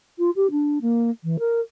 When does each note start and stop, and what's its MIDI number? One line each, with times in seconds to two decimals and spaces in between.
0.19 0.30 65
0.36 0.51 67
0.51 0.79 62
0.82 1.11 58
1.24 1.37 52
1.39 1.60 70